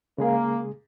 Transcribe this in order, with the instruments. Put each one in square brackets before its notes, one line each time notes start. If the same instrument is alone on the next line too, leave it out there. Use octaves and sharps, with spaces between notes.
[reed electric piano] C#3 G#3 G#4 [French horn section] A#3